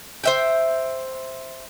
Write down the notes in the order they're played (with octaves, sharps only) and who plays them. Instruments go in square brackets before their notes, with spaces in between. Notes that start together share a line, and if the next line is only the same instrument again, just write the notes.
[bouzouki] C5 E5 G5